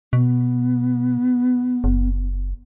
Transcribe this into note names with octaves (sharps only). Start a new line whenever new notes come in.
B2 B3
F#1